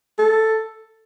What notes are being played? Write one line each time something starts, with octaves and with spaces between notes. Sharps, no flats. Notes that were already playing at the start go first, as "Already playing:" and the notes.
A4